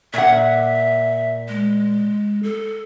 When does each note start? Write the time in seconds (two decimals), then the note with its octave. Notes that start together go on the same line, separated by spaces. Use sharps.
0.14 A#2 E5 F#5
1.49 G#3
2.43 A4